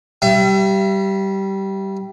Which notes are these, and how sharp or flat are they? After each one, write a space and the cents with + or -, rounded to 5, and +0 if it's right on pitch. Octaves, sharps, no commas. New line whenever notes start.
G3 -15 E5 +40